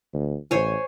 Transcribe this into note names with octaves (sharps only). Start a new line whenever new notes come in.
D2
A1 C5 C#5 G#5